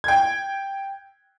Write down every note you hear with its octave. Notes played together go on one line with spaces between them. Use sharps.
G5 G#6